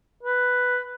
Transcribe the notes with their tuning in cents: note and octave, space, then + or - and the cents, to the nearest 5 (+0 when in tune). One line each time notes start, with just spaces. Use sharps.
B4 +5